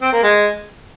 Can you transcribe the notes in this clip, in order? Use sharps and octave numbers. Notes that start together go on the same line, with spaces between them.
C4
A#3
G#3